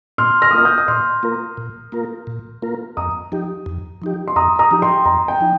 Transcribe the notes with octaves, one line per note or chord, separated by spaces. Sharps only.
A#2 C6 F6
F6 A#6
D#6
A#3 F4 A#4 F6
D#6 G6
D#6
A#2 C6 F6
A#3 F4 A#4
A#2
A#3 F4 A#4
A#2
A#3 F4 A#4
F2 A#5 D#6
F3 D#4 G4
F2
F3 D#4 G4
C6
F2 A#5 D#6
A#5 D#6
F3 D#4 G4
G5 C6
F2 A#5
G5
F3 D#4